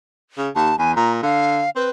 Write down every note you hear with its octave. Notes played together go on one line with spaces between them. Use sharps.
C#3
D#2 A5
E2 G#5
A#2 A#5
D3 F5
C4 B4